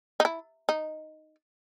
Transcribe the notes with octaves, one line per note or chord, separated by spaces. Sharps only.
D#4
E4
D#4